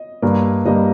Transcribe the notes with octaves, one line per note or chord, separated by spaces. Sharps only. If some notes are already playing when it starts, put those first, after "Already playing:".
Already playing: D#5
G2 G3 A#3
G2 G3 A#3 D#5